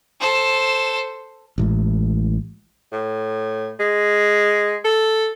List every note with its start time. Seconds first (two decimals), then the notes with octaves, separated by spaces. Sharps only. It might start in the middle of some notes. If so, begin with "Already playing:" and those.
0.21 A4 C5
1.58 A1 A2 G#3
2.92 A2
3.80 G#3
4.85 A4